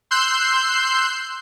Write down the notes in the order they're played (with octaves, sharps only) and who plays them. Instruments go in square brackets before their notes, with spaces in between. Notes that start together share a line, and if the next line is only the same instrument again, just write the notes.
[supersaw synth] C6 E6 F#6 G6 C7